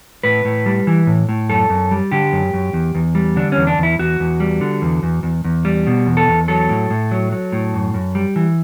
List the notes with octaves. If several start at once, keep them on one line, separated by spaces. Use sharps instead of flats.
A2 B4
A2
G3
E3
A2
A2
F#2 A4
F#2
G3
D3 G4
F#2
F#2
E2
E2
G3
D3 D4
E2 C#4
D4
E2
E4
E2 F#4
E2
G3
D3
E2
E2
E2
E2
G3
B2
E2
A4
E2
F#3 A4
A2
A2
F#3
F#3
A2
F#2
F#2
G3
E3